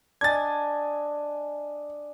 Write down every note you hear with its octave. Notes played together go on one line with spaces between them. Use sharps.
D4 D#5 G#5 G#6 A6